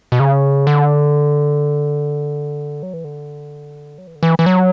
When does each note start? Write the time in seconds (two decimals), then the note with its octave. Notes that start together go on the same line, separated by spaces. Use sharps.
0.12 B2
0.20 C#3
0.67 D3
2.83 F#3
2.93 E3
3.04 D3
3.98 F#3
4.07 E3
4.15 D3
4.23 E3
4.39 E3
4.46 F#3